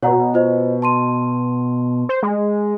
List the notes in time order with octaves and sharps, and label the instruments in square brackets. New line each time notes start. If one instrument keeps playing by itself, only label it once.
[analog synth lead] B2 [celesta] C#5 F#5 A#5
[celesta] F4 C5 D#5
A5 C6 D#7
[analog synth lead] C5
G#3